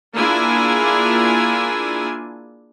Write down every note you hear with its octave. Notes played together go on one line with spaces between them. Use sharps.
A#3 D4 E4 F4 G#4 G#5